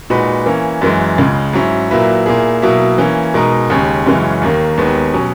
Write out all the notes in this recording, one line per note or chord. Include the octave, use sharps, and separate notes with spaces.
A#2 G#3 D#4 F#4 B4
E3 A#3 C#4
F#2 E3 G#3
C#2 C#3 G#3
G#2 F#3 C#4 E4
A#2 F#3 A#3 E4 B4
A#2 A#3 E4 G#4
B2 F#3 A#3 E4
E3 A#3 C#4
B2 G#3 D#4 A#4
D#2 C#3 G#3 C#4
F#2 C#3 E3 G#3 C#4
D#2 D#3 A#3
D#2 D#3 G#3 B3
B2 F#3 C#4